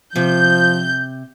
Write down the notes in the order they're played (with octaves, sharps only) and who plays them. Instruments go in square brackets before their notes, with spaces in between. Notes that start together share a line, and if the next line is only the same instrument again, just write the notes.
[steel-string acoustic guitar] C3 [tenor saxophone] F3 [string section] G6